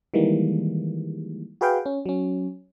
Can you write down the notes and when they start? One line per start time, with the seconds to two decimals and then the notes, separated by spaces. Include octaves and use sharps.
0.14 D#3 E3 G3 G#3 A#3
1.61 F#4 G#4 B4 F5 G5
1.86 C#4
2.06 F#3 C#4